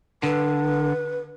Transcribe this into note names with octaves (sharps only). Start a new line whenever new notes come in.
D3 B4